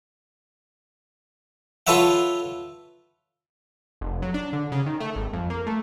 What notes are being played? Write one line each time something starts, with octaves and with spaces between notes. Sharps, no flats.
F4 A4 B4 C#5 E5 F#5
F1
F#3
D4
D3
C#3
D#3
A3
G#1
F2
A#3
A3